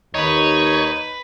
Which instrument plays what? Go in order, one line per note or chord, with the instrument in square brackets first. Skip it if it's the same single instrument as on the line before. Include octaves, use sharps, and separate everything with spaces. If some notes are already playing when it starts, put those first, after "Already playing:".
[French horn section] D#2 [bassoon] D#4 [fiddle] B4 [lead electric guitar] C#5